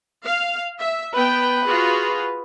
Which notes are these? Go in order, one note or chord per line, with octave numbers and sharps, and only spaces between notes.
F5
E5
B3 B4 G5
F4 F#4 G#4